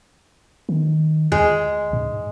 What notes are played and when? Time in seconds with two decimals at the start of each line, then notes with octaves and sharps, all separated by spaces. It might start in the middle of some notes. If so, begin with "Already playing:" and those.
0.69 D#3
1.32 D2 G#3
1.93 G#2